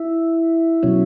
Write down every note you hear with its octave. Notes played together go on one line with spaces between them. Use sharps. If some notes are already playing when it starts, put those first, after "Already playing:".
Already playing: E4
B2 F#3 C#4